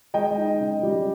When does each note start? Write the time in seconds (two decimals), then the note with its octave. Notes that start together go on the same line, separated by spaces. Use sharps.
0.14 G#3 D#5 G5
0.37 D#4
0.60 C#3
0.83 G3